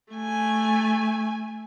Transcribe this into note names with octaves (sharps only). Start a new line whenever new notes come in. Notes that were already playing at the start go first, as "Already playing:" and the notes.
A3 G#5